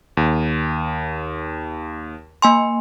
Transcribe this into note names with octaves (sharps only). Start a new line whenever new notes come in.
D#2
A#3 G#5 C6